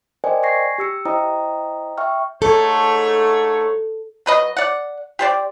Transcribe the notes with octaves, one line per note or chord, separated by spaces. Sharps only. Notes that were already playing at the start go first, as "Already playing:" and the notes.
A#4 C5 D5 D#5 G5 G#5
G#5 C#6 G#6 A#6 C7
G4 E6 C#7
E4 C5 D#5 G5 A#5 D#6
E5 G5 C#6 F6
G#2 A3 A4 C#5
F#3 B4 D#5
D5 F#5
G4 C5 D5